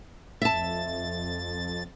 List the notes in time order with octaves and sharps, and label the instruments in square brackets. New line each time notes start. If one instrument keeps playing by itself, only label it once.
[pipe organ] F2 A6 [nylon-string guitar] E5 A5